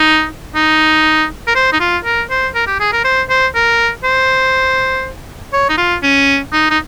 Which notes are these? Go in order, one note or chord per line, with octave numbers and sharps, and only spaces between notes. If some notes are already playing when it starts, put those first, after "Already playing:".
Already playing: D#4
D#4
A#4
C5
D#4
F4
A#4
C5
A#4
G4
G#4
A#4
C5
C5
A#4
C5
C#5
D#4
F4
C#4
D#4
D#4